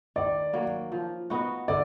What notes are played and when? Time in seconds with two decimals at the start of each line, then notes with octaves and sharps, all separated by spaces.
0.16 D#3 D5
0.53 F#3 A#3
0.92 F3
1.30 B3 D#4 F#4
1.68 D3 D5